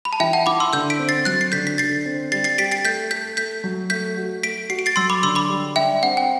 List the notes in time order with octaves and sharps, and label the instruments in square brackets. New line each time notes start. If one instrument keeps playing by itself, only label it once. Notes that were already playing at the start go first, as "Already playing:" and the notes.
[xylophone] B5
A5
[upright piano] E3 [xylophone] E5 G5
[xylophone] F#5 A5
[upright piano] E4 [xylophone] B5 D6
[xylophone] C6 E6
[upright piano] D3 [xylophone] E6 G6
[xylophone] B6 D7
[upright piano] C4
[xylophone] A6 C7
[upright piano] F#3 [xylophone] F#6 A6
[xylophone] C7
[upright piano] D3 [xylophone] G6 B6
[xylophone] B6
[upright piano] D3 [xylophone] A6 C7
[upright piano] C4
[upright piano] G3 [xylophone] A6 C7
[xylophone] A6 C7
[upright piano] G4 [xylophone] B6 D7
[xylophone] A6 C7
[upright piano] A3 [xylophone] G6 B6
[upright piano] A4 [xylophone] G6 B6
[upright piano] A3 [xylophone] G6 B6
[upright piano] F#3
[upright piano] A3 [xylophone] G6 B6
[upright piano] F#4
[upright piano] A3 [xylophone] B6 D7
[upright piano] F#4 [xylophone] C7
[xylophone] D7
A6 C7
[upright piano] F#3 [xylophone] C6 E6
[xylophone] B5 D6
[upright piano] D3 [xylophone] C6 E6
[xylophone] B5 D6
[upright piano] G3
[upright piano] D4 [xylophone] E5 G5
[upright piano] C4 [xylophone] F#5
[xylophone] G5